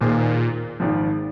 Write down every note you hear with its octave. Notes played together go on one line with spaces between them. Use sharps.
D#2 A#2 D#3 A#3 G#4 C5
G#1 G#2 F3